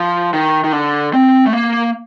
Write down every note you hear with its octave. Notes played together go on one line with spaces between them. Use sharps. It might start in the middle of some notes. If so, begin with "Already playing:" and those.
Already playing: F3
D#3
D#3
D3
C4
A3
A#3